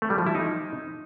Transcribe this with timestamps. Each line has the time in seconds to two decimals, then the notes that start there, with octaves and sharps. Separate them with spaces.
0.02 A3
0.10 G3
0.18 F3
0.27 E4
0.35 D#4